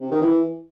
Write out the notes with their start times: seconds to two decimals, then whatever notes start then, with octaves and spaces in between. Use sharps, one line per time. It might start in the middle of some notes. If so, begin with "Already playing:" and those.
0.01 C3
0.11 D#3
0.21 E3